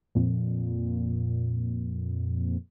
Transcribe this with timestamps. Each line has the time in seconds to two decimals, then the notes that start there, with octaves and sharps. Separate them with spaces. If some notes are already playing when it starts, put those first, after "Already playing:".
0.15 F2 A#2